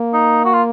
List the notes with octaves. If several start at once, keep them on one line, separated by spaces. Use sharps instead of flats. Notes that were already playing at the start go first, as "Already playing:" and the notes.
Already playing: A#3
D#4
F#4
F4